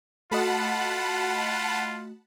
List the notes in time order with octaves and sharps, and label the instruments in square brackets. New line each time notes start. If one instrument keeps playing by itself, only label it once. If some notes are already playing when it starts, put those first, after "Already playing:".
[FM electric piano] A3 F#4 D#5 [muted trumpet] F4 [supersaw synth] F#5 A5 B5